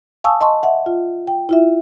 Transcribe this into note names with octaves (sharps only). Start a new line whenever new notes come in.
F5 G#5 A5 C#6 D#6 E6
D#5 A5 C6 C#6
E5 F#5
F4
G5
E4 F4 E5